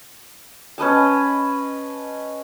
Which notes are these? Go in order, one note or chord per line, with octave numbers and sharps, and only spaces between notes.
C#4 B4 D#5 A5